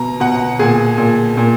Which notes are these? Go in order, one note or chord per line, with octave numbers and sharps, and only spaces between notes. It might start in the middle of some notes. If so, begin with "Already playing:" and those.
Already playing: B2 A#5
B2 F#5
A#2 G#4
A#2
A#2